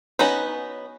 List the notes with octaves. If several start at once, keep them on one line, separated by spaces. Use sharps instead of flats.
B3 C#4 D#4 F#4 B4